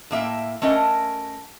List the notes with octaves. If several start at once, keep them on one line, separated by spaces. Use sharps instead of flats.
A2 A#3 E5 G5
A3 C#4 A#4 D#5